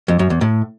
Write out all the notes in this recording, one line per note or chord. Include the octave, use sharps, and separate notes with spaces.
F2
F#2
E2
A2